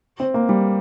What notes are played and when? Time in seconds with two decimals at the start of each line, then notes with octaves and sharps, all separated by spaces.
0.20 C4
0.34 A#3
0.49 G3